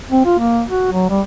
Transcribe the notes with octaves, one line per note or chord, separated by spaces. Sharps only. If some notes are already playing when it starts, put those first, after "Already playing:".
C4
F4
A#3
F#4
F#3
G3